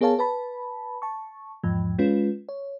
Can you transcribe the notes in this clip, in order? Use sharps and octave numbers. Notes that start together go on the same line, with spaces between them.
B3 G#4 A#4 C#5 F5 A5
B4 A5 B5
A5 C#6
E2 G#2 F3
G#3 C#4 F4 B4
C#5